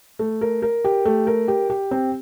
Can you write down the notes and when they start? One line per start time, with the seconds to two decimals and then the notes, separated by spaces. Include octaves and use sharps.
0.19 A3
0.41 A#4
0.62 A#4
0.85 G4
1.05 A3
1.27 A#4
1.48 G4
1.70 G4
1.91 C4